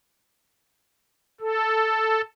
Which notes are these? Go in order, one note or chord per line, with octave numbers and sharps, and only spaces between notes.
A4